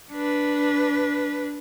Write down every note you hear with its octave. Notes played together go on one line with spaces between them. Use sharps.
D4 B4